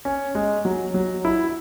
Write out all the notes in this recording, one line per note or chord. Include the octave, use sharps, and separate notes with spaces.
C#4
G#3
F#3
F#3
E4